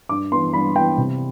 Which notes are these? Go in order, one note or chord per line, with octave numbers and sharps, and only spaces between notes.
G2 D6
E3 B3 C6
G2 B5
E3 B3 G5
C3